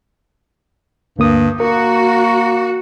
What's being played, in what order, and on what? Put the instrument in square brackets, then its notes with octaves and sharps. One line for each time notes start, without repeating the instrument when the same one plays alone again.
[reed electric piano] D2 A#3 D#6 [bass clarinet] G2
[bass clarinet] A#3 [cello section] F#4 [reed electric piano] A#4